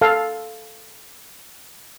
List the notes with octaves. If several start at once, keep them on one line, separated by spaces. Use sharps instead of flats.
A4 F5